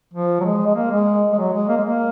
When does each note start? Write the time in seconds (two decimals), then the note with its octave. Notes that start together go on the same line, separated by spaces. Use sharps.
0.14 F3
0.40 F#3
0.44 G#3
0.66 G#3
0.76 A#3
0.91 G#3
1.33 G#3
1.38 F#3
1.53 G#3
1.69 A#3
1.77 G#3
1.85 A#3